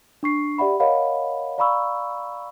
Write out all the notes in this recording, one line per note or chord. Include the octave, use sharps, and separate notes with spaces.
D4 C#6 C7
G4 D5 E5 F#5 B5
A#4 C#5 D#5 F5 F#5 B5
D5 F5 A#5 B5 C#6 E6